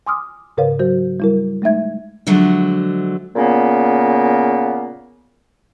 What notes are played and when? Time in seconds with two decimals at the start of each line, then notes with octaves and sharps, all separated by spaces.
0.07 G#5 C6 D6 D#6 F6
0.57 G#2 C#3 A#4 B4 C#5 F5
0.79 F#3 F#4 C5
1.20 G3 E4 A#4
1.62 G#3 A3 D#4 E5 G#6
2.27 D3 F3 F#3 G#3 A3
3.34 A#2 C#3 A#3 B3